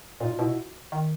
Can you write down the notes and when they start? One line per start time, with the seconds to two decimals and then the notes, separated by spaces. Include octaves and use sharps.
0.20 A#2 D#4 F4
0.31 F4
0.39 B2 E4 F#4
0.92 D#3